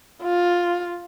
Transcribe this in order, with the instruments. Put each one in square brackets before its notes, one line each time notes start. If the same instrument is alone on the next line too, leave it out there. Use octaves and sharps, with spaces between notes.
[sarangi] F4